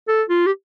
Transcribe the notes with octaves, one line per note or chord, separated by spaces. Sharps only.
A4
F4
G4